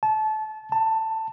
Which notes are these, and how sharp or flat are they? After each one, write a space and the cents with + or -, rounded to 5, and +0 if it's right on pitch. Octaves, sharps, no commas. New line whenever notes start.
A5 -25
A5 +15